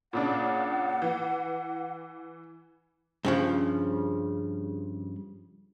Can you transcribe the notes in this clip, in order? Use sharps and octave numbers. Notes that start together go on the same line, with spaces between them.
A#2 C#3 D4 F#5
E3
G2 C#3 F3